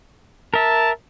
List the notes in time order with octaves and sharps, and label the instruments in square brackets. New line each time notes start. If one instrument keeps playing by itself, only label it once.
[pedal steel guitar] A#4 E5 [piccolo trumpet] A5